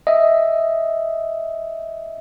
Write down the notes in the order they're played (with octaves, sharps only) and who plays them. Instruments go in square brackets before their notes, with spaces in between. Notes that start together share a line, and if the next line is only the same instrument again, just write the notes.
[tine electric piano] D#5 E5